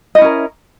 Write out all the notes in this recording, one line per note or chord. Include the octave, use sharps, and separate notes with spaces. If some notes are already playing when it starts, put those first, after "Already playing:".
C#4 E4 A#4 D#5